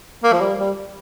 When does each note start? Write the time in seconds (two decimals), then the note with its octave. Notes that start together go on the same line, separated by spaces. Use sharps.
0.23 A#3
0.32 F3
0.41 G3
0.58 G3